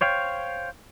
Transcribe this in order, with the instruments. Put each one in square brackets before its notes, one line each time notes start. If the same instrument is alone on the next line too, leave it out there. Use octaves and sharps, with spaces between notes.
[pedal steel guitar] C5 C#5 F5 G5